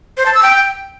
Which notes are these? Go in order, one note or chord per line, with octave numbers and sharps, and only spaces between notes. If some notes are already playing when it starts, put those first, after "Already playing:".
C5
A5
E6
G5